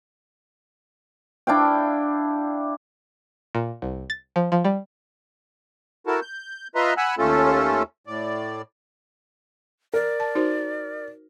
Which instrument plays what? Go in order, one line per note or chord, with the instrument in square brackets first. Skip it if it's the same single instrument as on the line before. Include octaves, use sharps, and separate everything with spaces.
[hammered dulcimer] D4 E4 F5 G5
[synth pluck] A#2
C2
A6
F3
F3
G3
[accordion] E4 F#4 A4 A#4 A5
G6
F4 B4 D#5 E5 A#5 C6
F#5 G#5 B5 E6 F#6
D#2 A3 C#4 F4 A4
A2 D5
[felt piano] A#4 [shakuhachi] D5
[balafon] A5
D#4 F#4 C5